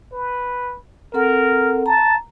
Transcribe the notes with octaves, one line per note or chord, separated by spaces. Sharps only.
B4
C4 A4 A#4 F#5
A5 A#5